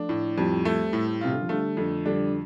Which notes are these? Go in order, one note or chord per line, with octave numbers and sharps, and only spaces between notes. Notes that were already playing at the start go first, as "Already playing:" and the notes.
Already playing: F3 A3 D4
A2
F2 G3 C4
A3
A2
C3 F4
D3
F3
D3 G3 A3
F2 D3
D3 G3 D4